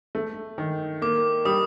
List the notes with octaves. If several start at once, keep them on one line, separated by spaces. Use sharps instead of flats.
A3
D#3
A#3 D6
G3 D#6